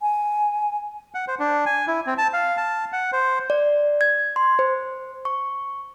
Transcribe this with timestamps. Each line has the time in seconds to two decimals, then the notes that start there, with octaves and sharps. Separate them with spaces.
0.01 G#5
1.15 F#5
1.28 C5
1.39 D4
1.66 G#5
1.87 E4
2.07 C4
2.18 A5
2.33 F5
2.57 A5
2.92 F#5
3.13 C5
3.50 D5
4.01 G#6
4.36 C6
4.59 C5
5.25 C#6